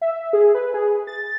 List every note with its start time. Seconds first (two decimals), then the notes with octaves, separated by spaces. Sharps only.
0.01 E5
0.33 G#4
0.55 B4
0.74 G#4
1.07 A6